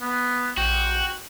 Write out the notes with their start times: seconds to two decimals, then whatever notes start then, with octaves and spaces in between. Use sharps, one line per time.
0.01 B3
0.57 A#1 F#4 G5